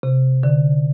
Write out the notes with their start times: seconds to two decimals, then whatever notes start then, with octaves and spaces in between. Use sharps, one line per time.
0.03 C3
0.43 D3